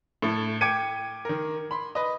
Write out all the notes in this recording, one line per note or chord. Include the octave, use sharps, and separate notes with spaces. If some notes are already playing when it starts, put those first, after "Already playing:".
A2 A3 A4
G5 D6 G#6 C#7 D#7
D#3 A#4
B5 C6
B4 D#5